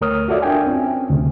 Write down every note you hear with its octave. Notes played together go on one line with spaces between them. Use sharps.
D2 A3 A#4 C#5 D#6 F6
F4 F#4 A4 D5 E5
D4 F4 A#4 G5 G#5
C4 C#4
D2 C3